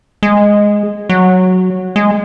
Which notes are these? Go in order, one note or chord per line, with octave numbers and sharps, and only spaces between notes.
G#3
F#3
G#3